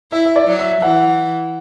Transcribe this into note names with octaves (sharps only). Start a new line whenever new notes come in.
E4 E5
E5
D5
F#3
E5
E3 F#5